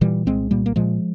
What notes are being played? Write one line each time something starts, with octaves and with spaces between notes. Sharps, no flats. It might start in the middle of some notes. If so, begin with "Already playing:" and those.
A#2 E3 G3
C2 G#3 C4
A#2 G3 A#3
A#3
A#2 F3 G#3